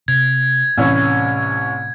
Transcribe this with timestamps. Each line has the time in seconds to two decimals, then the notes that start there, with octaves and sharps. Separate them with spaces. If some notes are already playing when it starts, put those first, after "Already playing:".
0.08 C3 G#6
0.78 C2 A2 C3 E3 C#4